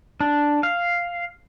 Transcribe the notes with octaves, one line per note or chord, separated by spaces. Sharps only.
D4
F5